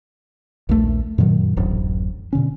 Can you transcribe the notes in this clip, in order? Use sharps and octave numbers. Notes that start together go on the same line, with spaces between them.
A#1 D#2 A3
F#2 A#2 D#3 F#3
D1 A1 F#2
B2 D3 C#4